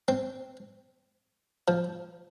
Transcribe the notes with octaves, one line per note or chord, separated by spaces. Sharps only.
C4
F3